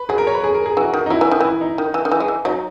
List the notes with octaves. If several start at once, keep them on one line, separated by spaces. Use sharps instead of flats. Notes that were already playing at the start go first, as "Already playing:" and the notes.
Already playing: B4
F#3 G#4
A#4
C#5
B4
G#4
A#4
G#4
E3 F#4
D#3
D#4
F#3 E4
E3
D#3
E3 E4
D#4
D#3
E3
D#3
E3
G#3
E3
F#3 D#4